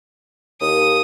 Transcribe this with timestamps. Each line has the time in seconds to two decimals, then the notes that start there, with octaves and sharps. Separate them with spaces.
0.61 D#2 D#6